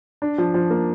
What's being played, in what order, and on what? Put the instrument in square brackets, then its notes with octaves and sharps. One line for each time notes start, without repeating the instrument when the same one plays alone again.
[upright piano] D4
F3
F3
A#3